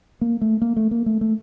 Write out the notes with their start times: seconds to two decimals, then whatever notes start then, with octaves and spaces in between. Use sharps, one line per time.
0.21 A#3
0.41 A3
0.62 A#3
0.76 A3
0.91 A#3
1.06 A3
1.21 A3